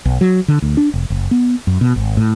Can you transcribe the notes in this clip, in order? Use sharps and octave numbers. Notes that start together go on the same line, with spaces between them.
B1
F#3
D3
D2
D4
F1
F#1
B3
F#2
B2
G#1
A2